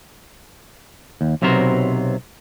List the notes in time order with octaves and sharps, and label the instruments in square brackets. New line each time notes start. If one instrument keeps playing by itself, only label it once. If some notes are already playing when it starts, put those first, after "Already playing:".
[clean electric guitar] D#2
B1 C3 F#3 B3 A#4 C5